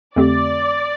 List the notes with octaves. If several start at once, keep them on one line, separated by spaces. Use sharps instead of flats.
F2 D3 A3 C4 G4 D5